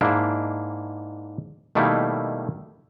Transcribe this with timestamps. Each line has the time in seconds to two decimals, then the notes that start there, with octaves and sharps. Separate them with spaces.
0.01 G#2 A#3 D4 E4
1.75 B2 D#3 G3 A3 A#3 E4